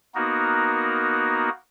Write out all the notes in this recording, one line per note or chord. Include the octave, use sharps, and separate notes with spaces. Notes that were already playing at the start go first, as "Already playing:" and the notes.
A#3 B3 D#4 F#4 A#4